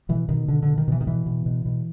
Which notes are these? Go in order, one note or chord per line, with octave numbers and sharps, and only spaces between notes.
B2 E3
B2 D#3
B2 D3
D3
B2
D#3
B2 E3
D#3
B2 E3
B2
B2
B2